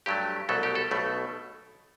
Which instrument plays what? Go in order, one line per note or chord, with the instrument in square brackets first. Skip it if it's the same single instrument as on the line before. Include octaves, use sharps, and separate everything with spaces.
[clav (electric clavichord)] G2 F#3 A3 G4
C2 B2 F#3 A3 A4
G4
A4
B1 B2 A3